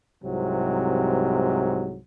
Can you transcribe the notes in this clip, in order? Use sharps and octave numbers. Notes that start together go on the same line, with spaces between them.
C2 G#2 C3 F#3